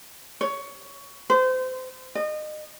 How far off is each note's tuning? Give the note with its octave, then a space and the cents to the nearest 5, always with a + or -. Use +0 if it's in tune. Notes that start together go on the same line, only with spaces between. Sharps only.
C#5 +15
C5 -30
D#5 -30